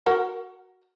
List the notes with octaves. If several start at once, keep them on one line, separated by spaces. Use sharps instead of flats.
F#4 A#4 F#5